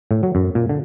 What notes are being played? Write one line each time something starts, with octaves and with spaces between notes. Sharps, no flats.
A2
F#3
F#2
A#2
D3